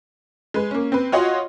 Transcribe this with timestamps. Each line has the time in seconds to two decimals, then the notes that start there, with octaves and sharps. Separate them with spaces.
0.54 G#3 B4
0.71 A#3 C#4
0.92 C4 B4
1.12 F4 F#4 C#5 D#5 F#5 C6